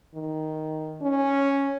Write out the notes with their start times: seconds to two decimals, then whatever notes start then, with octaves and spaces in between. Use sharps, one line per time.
0.15 D#3
1.02 C#4